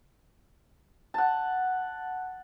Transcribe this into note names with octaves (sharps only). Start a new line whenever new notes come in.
F#5 A5